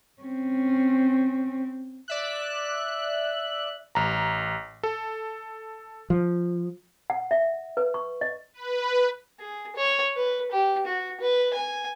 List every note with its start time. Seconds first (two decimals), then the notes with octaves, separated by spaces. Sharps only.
0.22 C4 C#4
2.08 D5 E5 F#6
3.95 A1 A#5
4.83 A4
6.10 F3
7.10 F#5
7.31 E5
7.77 B4
7.94 C#6
8.21 D#5
8.54 B4
9.39 G#4
9.76 C#5
10.17 B4
10.52 G4
10.87 F#4
11.21 B4
11.54 G#5